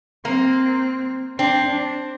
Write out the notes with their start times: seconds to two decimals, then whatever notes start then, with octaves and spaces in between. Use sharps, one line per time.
0.25 A#3 C4
1.38 C4 D4
1.66 D4